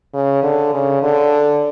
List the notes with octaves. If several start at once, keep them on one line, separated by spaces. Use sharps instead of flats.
C#3
D3
C#3
D3